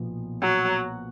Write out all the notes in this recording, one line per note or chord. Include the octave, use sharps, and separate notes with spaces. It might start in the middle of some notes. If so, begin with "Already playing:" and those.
Already playing: B1 A#2 F3 B3
F#3